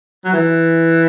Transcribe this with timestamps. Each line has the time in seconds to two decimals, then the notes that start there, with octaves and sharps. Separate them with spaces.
0.25 F#3
0.33 E3